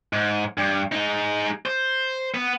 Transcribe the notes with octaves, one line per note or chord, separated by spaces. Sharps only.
G#2
G2
G#3 D#4
C5
B3